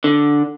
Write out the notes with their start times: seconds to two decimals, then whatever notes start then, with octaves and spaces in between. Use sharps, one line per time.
0.04 D3